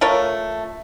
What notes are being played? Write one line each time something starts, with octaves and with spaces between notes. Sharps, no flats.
A3 F4 A#4 C#5